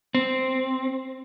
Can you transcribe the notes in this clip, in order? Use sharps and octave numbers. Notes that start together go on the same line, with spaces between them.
C4